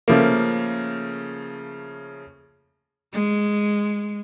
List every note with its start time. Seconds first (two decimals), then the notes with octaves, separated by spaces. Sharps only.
0.08 C#3 F3 A3 A#3
3.13 G#3